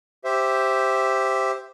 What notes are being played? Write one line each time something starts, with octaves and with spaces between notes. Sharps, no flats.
G4 C5 E5